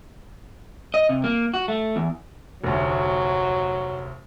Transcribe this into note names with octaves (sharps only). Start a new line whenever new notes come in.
D#5
C3
A#3
F#4
A3
E2
F1 D2 F#3